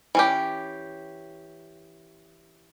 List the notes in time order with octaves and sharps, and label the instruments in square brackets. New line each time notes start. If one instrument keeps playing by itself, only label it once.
[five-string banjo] E3 C#4 G4